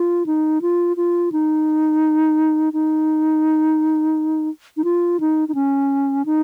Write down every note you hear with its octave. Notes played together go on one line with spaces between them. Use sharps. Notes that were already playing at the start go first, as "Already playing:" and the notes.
Already playing: F4
D#4
F4
F4
D#4
D#4
D#4
F4
D#4
D#4
C#4
D#4